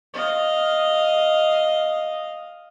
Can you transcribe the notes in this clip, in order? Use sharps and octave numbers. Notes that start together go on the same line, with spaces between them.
D#5 F5